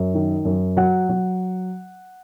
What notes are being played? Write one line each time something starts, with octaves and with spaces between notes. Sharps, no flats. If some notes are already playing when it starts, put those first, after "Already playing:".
Already playing: F#2
D#3
F#2
F#3 F#5
F#3